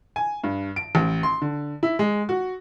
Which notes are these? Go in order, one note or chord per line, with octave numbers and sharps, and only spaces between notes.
G#5
G2
D7
A1
C6
D3
E4
G#3
F#4